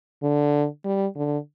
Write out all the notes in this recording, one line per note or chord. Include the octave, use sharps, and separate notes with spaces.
D3
G3
D3